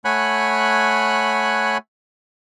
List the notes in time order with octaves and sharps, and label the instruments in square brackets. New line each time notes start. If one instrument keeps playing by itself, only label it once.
[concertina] A3 C#5 F#5 G#5 B5 F#6